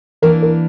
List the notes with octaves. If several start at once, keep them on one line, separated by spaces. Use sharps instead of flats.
E3 A#3 D4 A#4
A#4